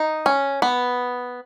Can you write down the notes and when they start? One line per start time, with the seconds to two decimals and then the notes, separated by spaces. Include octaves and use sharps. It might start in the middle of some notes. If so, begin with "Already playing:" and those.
Already playing: D#4
0.26 C#4
0.62 B3